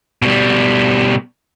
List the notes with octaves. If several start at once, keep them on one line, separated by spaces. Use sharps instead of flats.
B2 G3